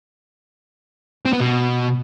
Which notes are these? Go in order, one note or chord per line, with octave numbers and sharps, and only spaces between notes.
C4
B3
B2